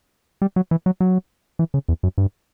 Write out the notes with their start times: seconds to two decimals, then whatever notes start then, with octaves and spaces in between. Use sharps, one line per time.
0.42 G3
0.56 F#3
0.71 E3
0.86 F#3
1.00 F#3
1.59 E3
1.74 C#3
1.88 E2
2.03 F#2
2.18 G2